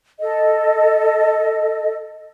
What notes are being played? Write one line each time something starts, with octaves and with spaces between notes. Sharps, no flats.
A4 D#5